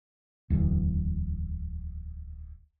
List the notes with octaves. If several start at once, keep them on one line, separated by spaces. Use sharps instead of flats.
D1 E2